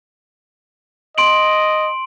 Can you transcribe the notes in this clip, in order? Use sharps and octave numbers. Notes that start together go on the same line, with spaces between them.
D#5 C6 D7 F#7